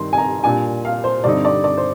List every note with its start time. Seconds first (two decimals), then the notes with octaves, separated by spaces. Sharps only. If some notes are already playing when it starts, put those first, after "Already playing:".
Already playing: G2 D#3 C4 C6
0.13 G#5
0.18 A#5
0.44 A#2 G3 D4 G#5
0.85 F5
1.04 C5
1.24 G2 D3 G3 C4 D#4 D5
1.45 D5
1.64 D5
1.77 C5